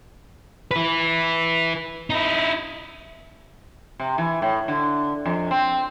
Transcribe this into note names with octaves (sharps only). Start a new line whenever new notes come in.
E4 B4
D#4 E4
C3
E3
A2
D3
F2
C4